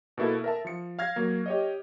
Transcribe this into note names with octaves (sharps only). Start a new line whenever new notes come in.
B2 A#3 E4 A4
A#4 E5 A5
F3 C#7
F5 F6 G#6 A#6
F#3 A#3
G4 C#5 D#5